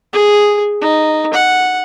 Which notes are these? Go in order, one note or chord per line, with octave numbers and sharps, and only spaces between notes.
G#4
D#4
F#5